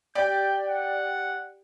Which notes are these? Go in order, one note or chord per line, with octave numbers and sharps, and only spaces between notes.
G4 D5 G5 G6
F#5